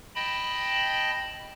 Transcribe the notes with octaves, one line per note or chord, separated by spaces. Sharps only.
D#5 G5 A5 B5